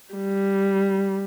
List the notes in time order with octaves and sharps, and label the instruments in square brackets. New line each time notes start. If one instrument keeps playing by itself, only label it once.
[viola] G3